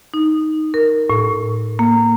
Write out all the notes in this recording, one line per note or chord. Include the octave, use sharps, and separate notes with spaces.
D#4
A#4
A2
A#3